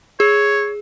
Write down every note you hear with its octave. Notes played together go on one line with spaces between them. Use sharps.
G#4 C#5